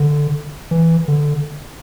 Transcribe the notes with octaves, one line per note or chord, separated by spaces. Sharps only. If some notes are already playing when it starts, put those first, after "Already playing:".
Already playing: D3
E3
D3